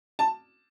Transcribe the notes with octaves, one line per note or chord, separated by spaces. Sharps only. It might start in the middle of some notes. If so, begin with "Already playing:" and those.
A5